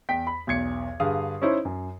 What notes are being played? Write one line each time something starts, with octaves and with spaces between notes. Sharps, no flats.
E2 G5 B6
B5
B1 E2 G#6 C#7
G2 D3 G#4 F5 D#6
C#4 D#4 E4 C5 C#5
F#2